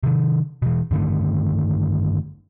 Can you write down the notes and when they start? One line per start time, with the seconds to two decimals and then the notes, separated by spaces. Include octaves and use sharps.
0.03 C3 D#3
0.62 B2 E3
0.91 G2 D3 D#3 A3